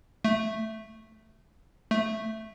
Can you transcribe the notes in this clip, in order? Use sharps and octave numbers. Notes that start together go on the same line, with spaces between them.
A3
A3